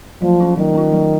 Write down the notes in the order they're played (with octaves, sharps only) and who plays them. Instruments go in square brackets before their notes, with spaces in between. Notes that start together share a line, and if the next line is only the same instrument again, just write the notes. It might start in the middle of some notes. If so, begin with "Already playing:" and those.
[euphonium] F3 [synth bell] F#3
[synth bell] C#4 F4
[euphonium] D#3 [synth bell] F#3
[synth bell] C#4 F4
F#3